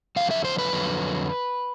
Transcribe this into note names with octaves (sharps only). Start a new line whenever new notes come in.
F2 D3 F#3 F5
E5
C5
B4
F2 D3 F#3